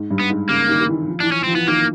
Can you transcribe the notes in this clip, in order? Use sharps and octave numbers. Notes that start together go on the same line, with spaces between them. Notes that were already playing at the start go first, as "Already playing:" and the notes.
Already playing: G#2
G2
B3
G#2
C#3 A#3
D#3
D#3
E3
F3
E3 D4
C#4
F3 C4
E3 B3
D#3 A#3